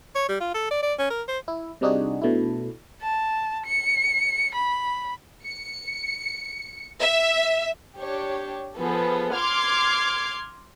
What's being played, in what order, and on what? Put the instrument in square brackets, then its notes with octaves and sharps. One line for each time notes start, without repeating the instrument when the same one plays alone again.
[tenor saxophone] C#5
G3
F4
A4
D5
D5
C#4
A#4
C5
[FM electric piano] E4
C3 G3 D4 D#4 F#4 G#4
B2 A3 D4 E4
[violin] A5
C#7
B5
[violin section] C#7
E5
[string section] D4 G4 C#5
F3 B3 G#4 A4
C6 D6 F6 G#6 C7